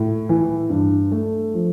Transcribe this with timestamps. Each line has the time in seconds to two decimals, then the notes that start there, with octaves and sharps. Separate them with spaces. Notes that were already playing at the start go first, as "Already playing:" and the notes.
Already playing: A2
0.29 E3
0.70 G2
1.12 A3
1.54 F3